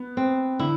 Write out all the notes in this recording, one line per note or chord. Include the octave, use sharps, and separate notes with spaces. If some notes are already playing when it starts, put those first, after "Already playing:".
Already playing: B3
C4
D3 E4